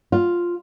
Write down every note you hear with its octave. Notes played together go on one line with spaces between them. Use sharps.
F4